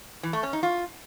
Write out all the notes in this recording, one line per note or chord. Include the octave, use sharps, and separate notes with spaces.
E3
A3
C#4
D#4
F4